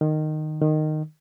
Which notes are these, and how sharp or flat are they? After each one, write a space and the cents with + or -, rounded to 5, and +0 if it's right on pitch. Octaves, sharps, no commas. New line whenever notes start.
D#3 -15
D#3 -15